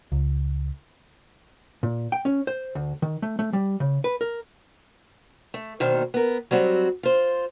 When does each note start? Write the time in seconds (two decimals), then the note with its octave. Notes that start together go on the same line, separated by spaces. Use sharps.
0.12 C#2
1.83 A#2
2.12 G5
2.25 C#4
2.47 C5
2.75 D2
3.02 D#3
3.22 A3
3.39 A3
3.53 G3
3.80 C#3
4.04 B4
4.21 A#4
5.54 A3
5.80 D2 B2 D#3 A#3 C5
6.14 B3 A#4
6.51 F#3 G3 C4 F#4
7.03 F4 C5